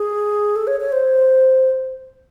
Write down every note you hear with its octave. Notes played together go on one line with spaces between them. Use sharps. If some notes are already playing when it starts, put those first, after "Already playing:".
Already playing: G#4
A4
C#5
C#5
C5